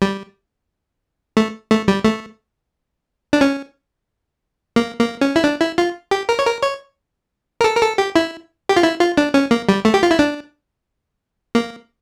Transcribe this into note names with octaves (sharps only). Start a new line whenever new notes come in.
G3
A3
A3
G3
A3
D4
C#4
A#3
A#3
C#4
E4
D4
E4
F4
G4
A#4
C#5
A#4
C#5
A#4
A4
A#4
A4
G4
E4
G4
F4
E4
F4
D4
C#4
A#3
G3
A3
G4
F4
E4
D4
A#3